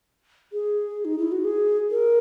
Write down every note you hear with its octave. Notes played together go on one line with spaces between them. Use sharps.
G#4
D#4
E4
F#4
G#4
A#4